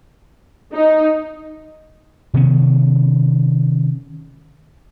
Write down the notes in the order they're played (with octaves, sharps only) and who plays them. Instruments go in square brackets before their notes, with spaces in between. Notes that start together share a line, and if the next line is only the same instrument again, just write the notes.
[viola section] D#4
[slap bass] C3 D#3 B3 C#4